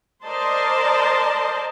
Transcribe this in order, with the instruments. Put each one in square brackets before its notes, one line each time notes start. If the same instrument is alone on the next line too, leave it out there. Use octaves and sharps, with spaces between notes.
[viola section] A#4 C5 D5 D#5 A5 C6